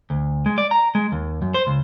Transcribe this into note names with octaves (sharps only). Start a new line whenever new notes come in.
D2
G#3
D5
A#5
G#3
D#2
F#2
C5
C#2